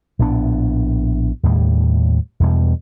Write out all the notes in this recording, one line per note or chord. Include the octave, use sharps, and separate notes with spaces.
A#1 A2 B3 D4
D#2 A2 G3
E2 B2 G3